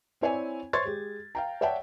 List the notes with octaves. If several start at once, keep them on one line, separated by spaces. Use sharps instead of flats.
C4 E4 C#5 D5 G#5
C5 C#5 C6 C#6 G#6 A6
G#3 G4
F5 G5 A#5
C#5 D5 E5 F#5 G5 A5